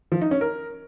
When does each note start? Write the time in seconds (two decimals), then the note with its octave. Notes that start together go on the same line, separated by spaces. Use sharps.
0.12 F3
0.21 D#4
0.31 C#4
0.41 A#4